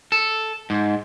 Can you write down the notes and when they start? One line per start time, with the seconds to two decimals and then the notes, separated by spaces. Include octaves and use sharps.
0.12 A4
0.70 G#2